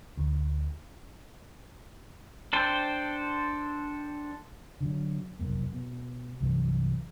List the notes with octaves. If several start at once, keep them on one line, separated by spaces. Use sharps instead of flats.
D2
D4 A4 C5 G5
D3 F#3
F1 B1 F#2 A#3
B2
C2 G2 E3 F#3